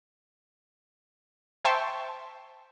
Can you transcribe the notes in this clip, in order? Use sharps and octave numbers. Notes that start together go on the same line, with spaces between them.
C5 E5 G5 A5 C6 C#6